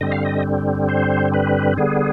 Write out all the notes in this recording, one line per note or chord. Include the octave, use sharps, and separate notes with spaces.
G2 D3 G3 C4 D#5
F5
D#5
C5
B4
D3 G3 B3 G#4